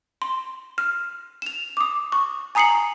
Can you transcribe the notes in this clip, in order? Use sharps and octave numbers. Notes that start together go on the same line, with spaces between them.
C6
F6
E7 F7
D6 D#6
C#6
G#5 A#5 D#6 C7 C#7 F#7